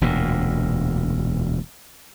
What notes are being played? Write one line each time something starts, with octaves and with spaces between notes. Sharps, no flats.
E1 D2 A#2